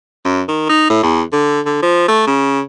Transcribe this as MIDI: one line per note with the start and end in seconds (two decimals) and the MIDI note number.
0.25 0.42 42
0.48 0.66 51
0.69 0.85 63
0.90 1.02 45
1.03 1.22 40
1.32 1.60 50
1.65 1.82 50
1.82 2.07 53
2.08 2.24 57
2.27 2.61 49